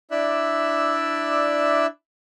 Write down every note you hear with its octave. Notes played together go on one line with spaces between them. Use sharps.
D4 E4 D5 E5 E6 F#6